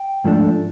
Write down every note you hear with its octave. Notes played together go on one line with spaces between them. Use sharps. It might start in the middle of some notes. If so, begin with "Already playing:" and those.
Already playing: G5
G#2 F3 A3 D4